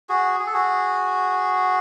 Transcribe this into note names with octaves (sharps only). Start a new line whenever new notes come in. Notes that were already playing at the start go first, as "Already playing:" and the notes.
F#4 G#4
G#4
A4
F#4 G#4